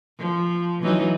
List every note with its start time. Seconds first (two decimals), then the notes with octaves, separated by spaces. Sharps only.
0.19 F3
0.83 E3 F#3 D#4